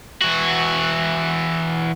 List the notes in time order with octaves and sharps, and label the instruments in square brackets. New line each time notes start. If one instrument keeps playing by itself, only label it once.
[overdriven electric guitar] E3 F#4